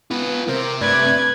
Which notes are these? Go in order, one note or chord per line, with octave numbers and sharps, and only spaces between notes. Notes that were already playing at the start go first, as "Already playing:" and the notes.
B3 F4 B4
C3 A#4 C5
G2 A3 B4 D5 G#6